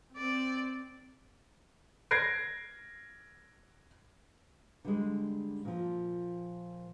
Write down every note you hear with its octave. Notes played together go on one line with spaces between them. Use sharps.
C4 D5
G#6 A#6 C7 D7
D3 G3 G#3
A#2 F3